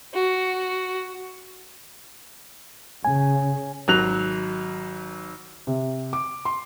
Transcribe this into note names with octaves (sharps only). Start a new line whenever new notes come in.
F#4
C#3 G#5
G#1 F#3 F#6 F7
C3
D6
C6